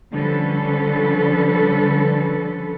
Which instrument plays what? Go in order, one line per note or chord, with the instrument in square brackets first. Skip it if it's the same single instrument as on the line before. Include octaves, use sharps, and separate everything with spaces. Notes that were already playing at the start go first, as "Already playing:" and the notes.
[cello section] D3 F3 G3 C#4 A4 B4